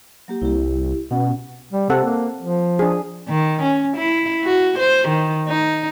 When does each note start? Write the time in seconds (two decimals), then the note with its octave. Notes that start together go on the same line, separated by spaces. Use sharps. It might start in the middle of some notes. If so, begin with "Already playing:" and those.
0.28 F#3 A#3 G4
0.42 C2 E4 G4
1.11 B2 C#4 F#5
1.73 G3
1.90 C3 C4 A4 F#5
2.04 A#3
2.42 F3
2.79 D4 G#4
3.29 D#3
3.62 C#4
3.97 E4
4.44 F#4
4.79 C5
5.08 D#3
5.49 D#4